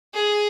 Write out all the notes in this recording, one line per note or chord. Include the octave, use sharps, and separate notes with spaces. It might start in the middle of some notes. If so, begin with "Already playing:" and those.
G#4